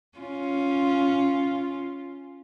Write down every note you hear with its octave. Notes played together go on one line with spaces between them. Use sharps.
C#4 F4